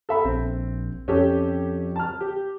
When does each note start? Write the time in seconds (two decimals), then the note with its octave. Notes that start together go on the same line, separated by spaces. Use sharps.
0.09 A4 E5 B5
0.25 A#1 C4
1.08 F2 C#4 G4 A4
1.96 A5 F6
2.21 G4